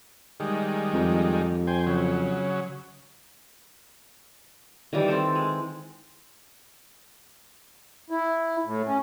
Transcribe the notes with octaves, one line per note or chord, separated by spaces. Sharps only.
D#3 G3 G#3
F2
C5 G5 G#5
C#3 F#3
D#3 E3 G3
C4 A4
G#3
E4
A2
C#4